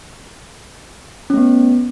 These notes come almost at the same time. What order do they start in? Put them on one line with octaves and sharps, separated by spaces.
C#4 A3 B3